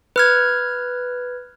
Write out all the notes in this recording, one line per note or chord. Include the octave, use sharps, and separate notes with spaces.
B4 F6 G#6